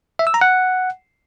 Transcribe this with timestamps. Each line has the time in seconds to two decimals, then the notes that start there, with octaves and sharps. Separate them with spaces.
0.19 E5
0.27 E6
0.34 A#5
0.41 F#5